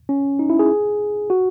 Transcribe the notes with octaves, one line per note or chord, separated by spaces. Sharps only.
C#4
D#4
E4
G#4
F#4